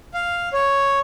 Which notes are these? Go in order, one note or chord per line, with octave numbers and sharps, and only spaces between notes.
F5
C#5